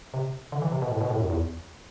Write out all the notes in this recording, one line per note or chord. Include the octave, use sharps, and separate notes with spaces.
C3
D3
E3
C3
B2
A2
B2
A2
F#2
E2